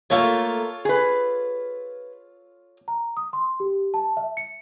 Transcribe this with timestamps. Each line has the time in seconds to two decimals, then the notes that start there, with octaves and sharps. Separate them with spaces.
0.10 A3 A#3 F4 A4 C#5
0.85 G#4 B4
2.88 A#5
3.17 D#6
3.33 C6
3.60 G4
3.94 A5
4.17 E5
4.37 C#7